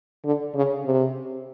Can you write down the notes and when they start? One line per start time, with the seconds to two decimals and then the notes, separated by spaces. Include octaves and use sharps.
0.24 D3
0.54 C#3
0.85 C3